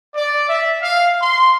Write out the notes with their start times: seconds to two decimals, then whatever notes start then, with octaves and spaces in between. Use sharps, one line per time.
0.14 D5
0.48 E5
0.81 F5
1.20 C6